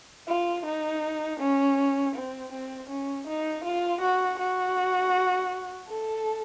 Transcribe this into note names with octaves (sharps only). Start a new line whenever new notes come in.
F4
D#4
C#4
C4
C4
C#4
D#4
F4
F#4
F#4
A4